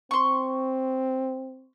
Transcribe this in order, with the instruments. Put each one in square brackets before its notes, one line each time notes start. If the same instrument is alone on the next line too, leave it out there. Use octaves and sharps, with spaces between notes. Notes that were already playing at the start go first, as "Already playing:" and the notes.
[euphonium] C4 [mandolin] C6 C#6